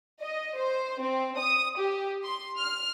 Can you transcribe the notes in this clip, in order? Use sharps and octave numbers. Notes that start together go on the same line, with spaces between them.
D#5
C5
C4
D#6
G4
C6
F6